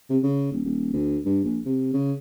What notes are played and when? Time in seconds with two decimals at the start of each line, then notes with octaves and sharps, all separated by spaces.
0.10 C3
0.23 C#3
0.52 D#1
0.65 D#1
0.93 D2
1.25 G2
1.44 A#1
1.66 C3
1.94 C#3